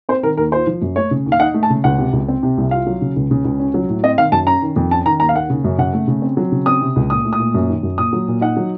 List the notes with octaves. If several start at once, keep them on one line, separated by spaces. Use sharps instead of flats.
C4 C5
D#3 A#4
D#2 A#4
F4 C5
F3
F#2
A3 C#5
C#3
D#2
F5
D#4 F#5
A3
A5
C#3
C#2 F#5
C3
C#2
C4
C3
C2
F4 F5
F#3
C#3
C#2
C#3
C#2
C#4
F#3
A2
C4 D#5
D#3 F5
F#2 A5
C#4 A#5
D#3
F2
C#4 A5
D#3 A#5
D#2 A#5
F5
A#3 F#5
C#3
F#2
C#3 F#5
A3
C#3
C4
F#3
C#3
C4 D#6
C3
C#2
A#2 D#6
A3
D#6
A#2
F#2
D#3
F#2
A#2 D#6
F#3
A#2
D#4 F#5
F#3